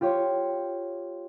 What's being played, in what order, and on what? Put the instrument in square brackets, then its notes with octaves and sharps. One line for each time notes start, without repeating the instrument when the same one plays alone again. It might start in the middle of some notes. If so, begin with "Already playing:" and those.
[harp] F4 G4 C5 C#5